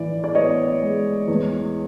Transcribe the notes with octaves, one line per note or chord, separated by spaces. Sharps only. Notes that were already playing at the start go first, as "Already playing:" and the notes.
Already playing: A2 E3 D5
D5
B3 C#5 D#5
G#3
E2